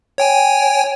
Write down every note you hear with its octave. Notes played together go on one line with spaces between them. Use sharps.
C#5 G5 G#5